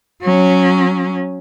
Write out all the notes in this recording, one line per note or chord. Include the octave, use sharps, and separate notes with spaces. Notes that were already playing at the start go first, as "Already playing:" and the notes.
F#3 C#4